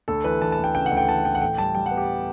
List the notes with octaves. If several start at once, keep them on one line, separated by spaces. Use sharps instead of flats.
D2 A4
E3 B4
E3 A5
A5
D2
G5
C#3 G5
F#5
D2
G5
E3 A5
E3 G5
F#5
A2 G5
G3 A5
G3 G5
F#5
B3
G4